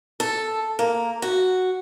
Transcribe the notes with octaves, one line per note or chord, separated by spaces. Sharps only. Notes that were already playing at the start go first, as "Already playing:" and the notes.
A4
A#3
F#4